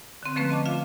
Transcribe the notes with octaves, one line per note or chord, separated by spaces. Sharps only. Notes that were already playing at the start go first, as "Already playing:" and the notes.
D3 C4
D3 F3 A3 A#3 C#4 B4
D#5 A5 D6
F4 E5 F5